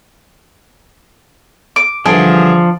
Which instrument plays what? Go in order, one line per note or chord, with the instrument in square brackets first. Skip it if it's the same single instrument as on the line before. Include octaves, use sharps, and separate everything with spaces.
[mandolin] D6
[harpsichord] G2 D3 E3 [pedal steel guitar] F3 [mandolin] D4 [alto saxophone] G#4